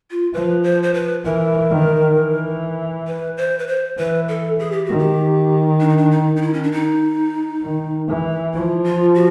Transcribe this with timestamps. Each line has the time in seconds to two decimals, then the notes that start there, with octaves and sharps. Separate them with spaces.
0.11 F4
0.34 F3 B4
0.64 C5
0.83 C5
0.94 B4
1.25 E3 A#4
1.70 D#3
2.16 E3
3.07 B4
3.37 C5
3.59 B4
3.67 C5
3.98 E3 B4
4.28 A4
4.59 G#4
4.72 G4
4.85 D#3 F#4
4.98 G4
5.80 D4
5.89 D#4
5.97 D4
6.11 D#4
6.36 D#4
6.42 E4
6.54 C#4
6.63 D4
6.72 D#4
7.63 D#3
8.08 E3
8.54 F3 E4
8.84 F4
9.15 F#4